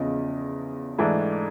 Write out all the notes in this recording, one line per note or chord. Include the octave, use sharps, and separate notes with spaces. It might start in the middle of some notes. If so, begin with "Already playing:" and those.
Already playing: E2 C#3 F3 D#5
G#2 E3 A3 D4